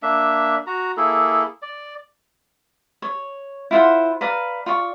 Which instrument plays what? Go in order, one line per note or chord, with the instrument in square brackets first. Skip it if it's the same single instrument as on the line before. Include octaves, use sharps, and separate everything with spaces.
[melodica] A#3 D4 E5
F#4 A#5
A#3 E4 G#4 A4
D5
[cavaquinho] C#5
E4 F4 C5 F#5
B4 D5 F5 A#5
F4 D5 C#6